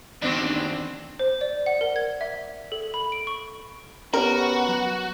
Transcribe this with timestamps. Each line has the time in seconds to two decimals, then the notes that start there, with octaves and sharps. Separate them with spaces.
0.22 E2 D#3 C4 D4 F#4
1.19 C5
1.41 D5
1.66 F#5
1.81 A#4
1.96 G#6
2.21 E5
2.72 A4
2.94 B5
3.12 D7
3.27 C#6
4.14 B3 C#4 F#4 G4 A#4 C#5
4.69 F#3